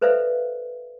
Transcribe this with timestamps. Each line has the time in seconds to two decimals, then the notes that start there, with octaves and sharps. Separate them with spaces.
0.01 A4 B4 C5 D5 E5 F5